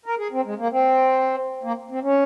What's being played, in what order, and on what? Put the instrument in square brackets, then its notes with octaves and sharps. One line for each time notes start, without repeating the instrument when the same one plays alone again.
[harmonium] A#4
G#4
C4
G#3
A#3
C4
A#3
C4
C#4